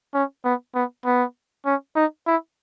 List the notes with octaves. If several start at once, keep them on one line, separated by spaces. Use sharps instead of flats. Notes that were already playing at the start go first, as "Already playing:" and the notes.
C#4
B3
B3
B3
C#4
D#4
E4